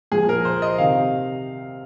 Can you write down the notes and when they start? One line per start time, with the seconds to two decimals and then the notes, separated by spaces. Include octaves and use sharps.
0.11 A#2 F3 G#4
0.29 A#4
0.45 C5
0.62 D#5
0.78 C3 D#3 F5